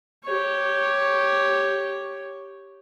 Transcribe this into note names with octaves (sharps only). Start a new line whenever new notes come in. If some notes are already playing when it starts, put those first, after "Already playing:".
G4 C#5